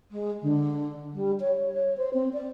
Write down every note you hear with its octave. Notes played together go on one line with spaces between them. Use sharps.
G#3
D3
G3
C#5
C#5
C5
C4
D5